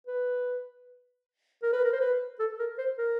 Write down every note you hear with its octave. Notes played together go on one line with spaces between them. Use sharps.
B4
A#4
B4
A#4
C5
B4
A4
A#4
C5
A#4